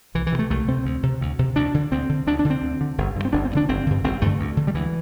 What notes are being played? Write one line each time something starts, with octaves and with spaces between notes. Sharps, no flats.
C2 E3
E3
C3
A3
C2 A3
C3 C4
D2
C3
D2
C3
D2 D4
D3
D2 C4
D3
D2 D4
D4
D3
C4
D2
D3
G1
G2 D3
C4
G1 D4
C4
G2
D3 D4
G1 C4
G2 D3
G1 C4
G2 D3 A3
D2
D3
G3
D2 E3